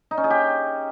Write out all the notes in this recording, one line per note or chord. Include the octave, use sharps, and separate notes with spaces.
D#4
C#4
G#4
G4